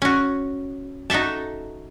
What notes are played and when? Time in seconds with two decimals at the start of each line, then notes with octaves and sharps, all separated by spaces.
0.02 C#4 F#4
1.10 D#4 F#4 A4 E5 A5